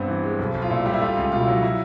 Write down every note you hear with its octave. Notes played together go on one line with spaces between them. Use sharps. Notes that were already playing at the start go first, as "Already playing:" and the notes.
Already playing: G2 B3 C4
E3
G#3
B1
B1
F4
A#2 E4
G3
E4
A3 F4
C#2 F4
B2 F4
E4
F#3
E4